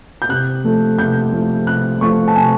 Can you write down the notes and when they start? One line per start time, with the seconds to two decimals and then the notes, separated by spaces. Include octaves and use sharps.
0.22 G6
0.29 C3 F#6
0.64 F3 A3
0.98 C3 G6
1.32 F3 A3
1.67 C3 F#6
2.01 F3 A3 C#6
2.28 A5
2.36 C3 G#5